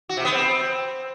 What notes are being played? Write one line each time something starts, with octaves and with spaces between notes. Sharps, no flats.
F#4
C3
B3
C4